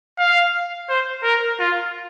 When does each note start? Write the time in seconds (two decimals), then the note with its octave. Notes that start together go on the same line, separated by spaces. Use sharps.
0.19 F5
0.89 C5
1.24 A#4
1.59 F4